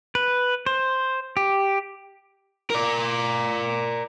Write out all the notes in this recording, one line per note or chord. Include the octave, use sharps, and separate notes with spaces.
B4
C5
G4
A#4 D5